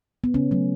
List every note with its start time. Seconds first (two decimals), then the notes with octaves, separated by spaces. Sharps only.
0.24 B3
0.34 C#3 C#4
0.51 F#3 A3